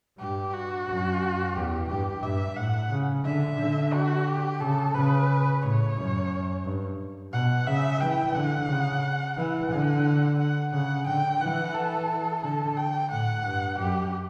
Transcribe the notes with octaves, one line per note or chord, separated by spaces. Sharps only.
G2 G4
F#4
F#2
E2 G4
G2 G4
G2 E5
A2 F#5
C#3
D3 E5
D3
F#4
G4
C#3 A4
C#3 B4
A2 C#5
F#2
G2
B2 F#5
C#3 E5
E3 G5
D3 F#5
C#3
E3 F#5
D3
F#5
C#3 F#5
D3 G5
E3 F#5
A4
D3 A4
G5
A2 F#5
G2
F#2 G4